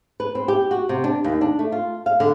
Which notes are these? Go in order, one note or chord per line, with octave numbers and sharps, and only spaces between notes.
B4
C4
G4
F#4
C3
D4
D#2
D4
A3
F4
F5
D3